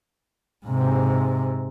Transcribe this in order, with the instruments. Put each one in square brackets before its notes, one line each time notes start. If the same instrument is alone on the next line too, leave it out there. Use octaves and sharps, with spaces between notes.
[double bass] G#2 C3